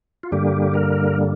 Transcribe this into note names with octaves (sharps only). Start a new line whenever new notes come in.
F4
G2 D3 G3 A#3 G4
A#4